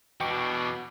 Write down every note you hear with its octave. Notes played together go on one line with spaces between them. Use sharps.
E2 B2 D4 G5 C#6 D6